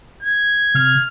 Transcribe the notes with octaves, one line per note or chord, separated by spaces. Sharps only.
G#6
C3 F6